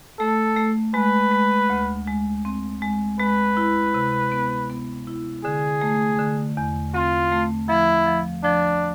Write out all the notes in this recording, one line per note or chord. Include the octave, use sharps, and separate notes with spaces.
A3 A4
A3
G#3 B4
G#3
D2
G#3
C4
G#3
G#3 B4
E4
C3
B3
B3
E4
D3 G#4
A3
D3
E2
C4 F4
A3
F3 E4
F3
F3 D4